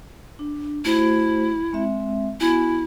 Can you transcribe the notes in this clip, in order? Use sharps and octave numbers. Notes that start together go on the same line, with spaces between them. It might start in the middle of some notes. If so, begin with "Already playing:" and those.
D4
A3 E4 F#4 C5
G#3 C4 E5
B3 E4 F#4 G#5